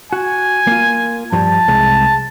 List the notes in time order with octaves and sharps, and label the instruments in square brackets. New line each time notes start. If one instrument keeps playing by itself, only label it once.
[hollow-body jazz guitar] F#4 [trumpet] G#5
[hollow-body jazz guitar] A#3 F4
[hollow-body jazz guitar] G2 F3 G3 [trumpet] A5
[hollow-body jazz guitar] C2 G#3